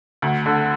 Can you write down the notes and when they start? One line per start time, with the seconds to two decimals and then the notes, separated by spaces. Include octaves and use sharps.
0.22 D2
0.46 D3